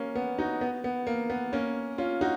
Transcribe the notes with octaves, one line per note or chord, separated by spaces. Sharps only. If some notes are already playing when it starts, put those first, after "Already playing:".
Already playing: A#3 C#4
B3
D#4 F#4
B3
B3
A#3
B3
A#3 C#4
C#4 F4
D#4 F#4